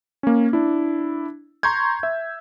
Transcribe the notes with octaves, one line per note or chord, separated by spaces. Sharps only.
A#3 C#4
D4 E4
A#5 C6 C#6 G6 G#6
E5